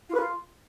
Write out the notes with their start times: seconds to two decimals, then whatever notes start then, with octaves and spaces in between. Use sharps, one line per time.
0.09 F4
0.14 B4
0.19 F4